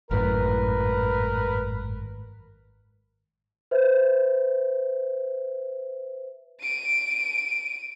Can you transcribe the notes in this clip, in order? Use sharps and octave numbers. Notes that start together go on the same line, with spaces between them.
G#1 F#2 A2 A#4 B4
B4 C5 E5
D7 D#7